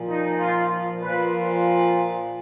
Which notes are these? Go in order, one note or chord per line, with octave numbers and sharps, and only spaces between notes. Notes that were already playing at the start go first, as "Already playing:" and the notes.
Already playing: A#2 F3
D#4
F4
A#2 F3 B4